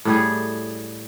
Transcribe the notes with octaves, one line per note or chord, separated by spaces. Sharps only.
A2 G3 G#4